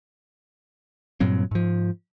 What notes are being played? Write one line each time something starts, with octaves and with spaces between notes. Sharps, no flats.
G2 A#2 F#3 C4
G#2 F3